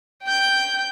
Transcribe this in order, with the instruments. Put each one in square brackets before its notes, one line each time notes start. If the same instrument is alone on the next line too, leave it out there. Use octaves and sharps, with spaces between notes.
[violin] G5 G6